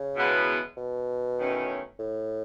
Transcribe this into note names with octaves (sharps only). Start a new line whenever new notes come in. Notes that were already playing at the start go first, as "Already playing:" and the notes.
Already playing: C#3
E2 B2 G#3 B3 E4
B2
E2 D#3 A3 C#4
A2